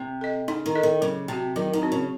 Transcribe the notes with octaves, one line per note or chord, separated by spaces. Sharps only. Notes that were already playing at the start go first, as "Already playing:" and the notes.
Already playing: C3
A4 D#5
C#3 D#4
D#3
A4 D#5
D#3
C#3 F#3
C3 C4 F#4
D#3 F#3
D#3
C4 F#4
C#3